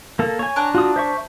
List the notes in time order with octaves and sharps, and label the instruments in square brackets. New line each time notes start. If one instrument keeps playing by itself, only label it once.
[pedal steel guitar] A#3 A4
C#5 G#5
[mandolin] D4 A#5 F#6
[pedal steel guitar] F4 F#4 D#6
C5 E5 C#6